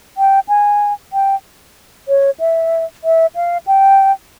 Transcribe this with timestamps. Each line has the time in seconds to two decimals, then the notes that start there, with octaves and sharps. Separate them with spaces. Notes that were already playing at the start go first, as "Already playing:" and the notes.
0.17 G5
0.49 G#5
1.13 G5
2.08 C#5
2.40 E5
3.04 E5
3.36 F5
3.67 G5